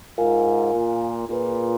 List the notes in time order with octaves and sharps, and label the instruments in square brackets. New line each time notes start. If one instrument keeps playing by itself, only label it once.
[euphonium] G#2 [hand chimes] F4 A#4 F5 G#5
[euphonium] A#2
[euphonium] A#2 [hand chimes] F4 G#4 B4